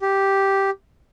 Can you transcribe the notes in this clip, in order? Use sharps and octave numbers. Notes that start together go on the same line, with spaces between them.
G4